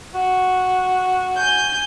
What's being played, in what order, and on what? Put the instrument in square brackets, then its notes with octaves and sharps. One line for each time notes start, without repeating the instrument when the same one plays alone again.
[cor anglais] F#4
[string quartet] G#5 G6